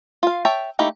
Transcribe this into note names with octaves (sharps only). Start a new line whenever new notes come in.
F4 F5
C#5 E5 G5 A5
A3 A#3 D#4 E4 G4